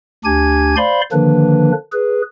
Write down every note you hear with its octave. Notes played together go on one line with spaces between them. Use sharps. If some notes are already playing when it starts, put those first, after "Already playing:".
D2 D4 G4 G#5 G#6
C5 D5 F5 B5 C6
D3 D#3 F3 A#3 D4 B4
G#4 B4